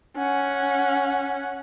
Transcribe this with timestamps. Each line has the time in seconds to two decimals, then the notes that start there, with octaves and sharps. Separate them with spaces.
0.17 C#4 F#5